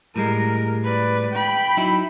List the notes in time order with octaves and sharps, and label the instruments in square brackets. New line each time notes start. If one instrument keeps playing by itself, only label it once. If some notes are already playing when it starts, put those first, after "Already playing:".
[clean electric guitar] A2 G3 G#3 [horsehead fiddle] A#4
[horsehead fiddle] B4 D5
G5 B5
[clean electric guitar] F#3 D#4 E4